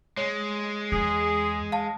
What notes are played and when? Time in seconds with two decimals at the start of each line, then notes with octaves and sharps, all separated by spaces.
0.17 G#3 C#5
0.92 E2 G#4
1.72 F5 A5